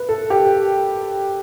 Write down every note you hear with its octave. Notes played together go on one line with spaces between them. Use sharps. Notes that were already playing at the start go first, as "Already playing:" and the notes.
Already playing: B4
A4
G4